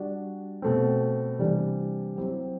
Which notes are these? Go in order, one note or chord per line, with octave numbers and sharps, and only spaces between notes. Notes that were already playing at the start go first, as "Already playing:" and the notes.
Already playing: G3 D4 F#4
B2 A3 C4
C3 E3 G3 D4
F#3 C4 E4 G4